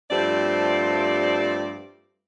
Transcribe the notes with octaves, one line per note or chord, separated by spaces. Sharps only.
G2 F3 A3 C4 G4 D5